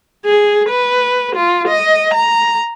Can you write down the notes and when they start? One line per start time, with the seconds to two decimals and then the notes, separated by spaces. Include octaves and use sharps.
0.25 G#4
0.69 B4
1.35 F4
1.67 D#5
2.14 A#5